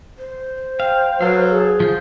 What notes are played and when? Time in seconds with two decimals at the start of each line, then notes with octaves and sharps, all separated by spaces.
0.18 C5
0.80 F5 G5
1.21 F#3 A4 B4 F5
1.51 G#4
1.80 F3 F4 G6